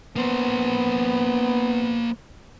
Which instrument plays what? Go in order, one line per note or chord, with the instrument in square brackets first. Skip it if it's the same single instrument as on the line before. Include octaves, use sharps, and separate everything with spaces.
[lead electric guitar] A#3 C5 [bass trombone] B3